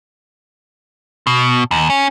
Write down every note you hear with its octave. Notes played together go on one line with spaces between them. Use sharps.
B2
D#2
C#4